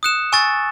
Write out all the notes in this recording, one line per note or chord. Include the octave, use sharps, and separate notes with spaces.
D#6 F#6 C#7 E7
G#5 C#6 E6 A6